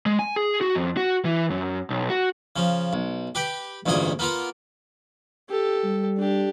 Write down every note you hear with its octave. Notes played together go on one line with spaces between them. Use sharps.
G#3
G#5
G#4
F#4
F2
F#4
E3
F#2
B1
F#4
C#3 F3
B1
G4 B4 G5
A1 D2 G2 A#2 G#4 D#5
A#3 B3 F4 A#4
G4 A4
G3
D4 G4